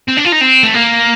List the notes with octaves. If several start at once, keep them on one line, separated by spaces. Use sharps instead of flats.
C4
D4
F4
D#4
C4
A3
A#3